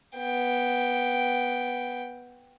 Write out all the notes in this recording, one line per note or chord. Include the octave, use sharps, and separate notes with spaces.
B3 G5